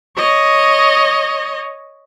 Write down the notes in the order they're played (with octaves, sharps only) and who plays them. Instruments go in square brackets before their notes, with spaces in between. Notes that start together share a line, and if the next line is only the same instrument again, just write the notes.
[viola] C#5 D#5